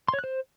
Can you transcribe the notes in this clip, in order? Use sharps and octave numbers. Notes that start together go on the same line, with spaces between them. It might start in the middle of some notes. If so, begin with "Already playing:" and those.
C6
C#5
F#6
C5